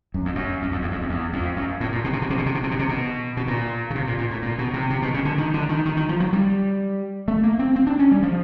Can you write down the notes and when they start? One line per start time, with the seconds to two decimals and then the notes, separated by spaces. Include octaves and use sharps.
0.14 F#2
0.25 F2
0.35 F#2
0.62 F#2
0.71 F2
0.82 E2
0.91 F2
1.01 F2
1.09 E2
1.33 F2
1.56 F#2
1.80 A2
1.92 A#2
2.04 B2
2.13 C3
2.22 B2
2.30 C3
2.38 B2
2.46 C3
2.55 B2
2.63 C3
2.71 B2
2.79 C3
2.89 B2
3.37 B2
3.48 A#2
3.90 C#3
3.95 C3
4.07 A#2
4.18 A#2
4.31 A2
4.42 A#2
4.58 B2
4.73 C3
4.90 C3
5.02 B2
5.14 C#3
5.25 D3
5.38 D#3
5.54 D3
5.69 D#3
5.85 D#3
5.97 D#3
6.09 F3
6.20 F#3
6.33 G3
7.28 A3
7.43 A#3
7.59 C4
7.76 C4
7.87 D4
7.99 C#4
8.11 G3
8.23 F3